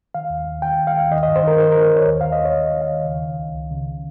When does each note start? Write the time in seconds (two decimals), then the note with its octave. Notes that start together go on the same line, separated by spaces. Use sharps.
0.15 D#3 F5
0.30 D#2
0.47 D#2
0.62 D#3 G5
0.80 D#2
0.87 F5
0.95 D#3
1.11 D#3 D#5
1.23 D#5
1.28 G2
1.36 C5
1.43 D#3 A#4
1.60 D#3 C5
1.72 A#4
1.77 D#3
1.92 D#3 C#5
2.08 D#2
2.21 F5
2.25 D#2
2.32 D#5
2.41 D#2 C#5
2.57 D#3
2.73 D#3
2.82 F5
2.89 D#3
3.05 C#3
3.22 C#3
3.38 C#2
3.54 C#2
3.71 C#3